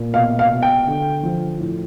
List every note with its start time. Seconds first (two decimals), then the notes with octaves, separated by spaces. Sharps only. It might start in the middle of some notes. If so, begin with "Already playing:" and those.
Already playing: A#2
0.14 B2 F5
0.39 F5
0.51 B2
0.63 G5
0.87 D3
1.23 F3
1.59 A2